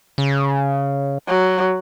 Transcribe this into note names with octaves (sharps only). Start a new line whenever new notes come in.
C#3
F#3